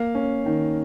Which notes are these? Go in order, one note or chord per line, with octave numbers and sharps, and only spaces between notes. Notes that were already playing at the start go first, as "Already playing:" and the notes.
Already playing: A#3 F5
C#4
D#3